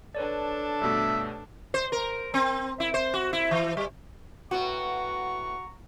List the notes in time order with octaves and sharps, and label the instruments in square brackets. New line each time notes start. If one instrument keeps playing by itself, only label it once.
[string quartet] D4 A4 [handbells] B4 C#5 D5
[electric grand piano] G2 B2 A3 [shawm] E5
[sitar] C5
A#4
C4
E4
C5
F#4
E4
E3
G3
[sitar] A2 B3 [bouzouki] F#4 [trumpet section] F#5 A#5 C#6